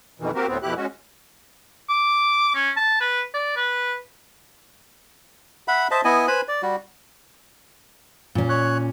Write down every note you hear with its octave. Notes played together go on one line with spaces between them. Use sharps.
F2 B2 D#3 E3
A#3 C4 F#4 G4 A#4
D2 A2 B3 C4
F2 B2 E4 G4 F#6
G#3 C#4 F#4
D6
C#4
A5
B4
D5
B4
E5 F#5 B5
C5 D#5 E5 A5
B3 E4 D#5 G#5
B4 C5 G#5 B5
D5
G3 F#4
A#2 C#4
C#5 F#6